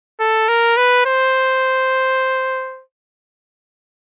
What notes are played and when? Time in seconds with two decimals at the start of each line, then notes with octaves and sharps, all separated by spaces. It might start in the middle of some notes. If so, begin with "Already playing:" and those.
0.20 A4
0.48 A#4
0.77 B4
1.06 C5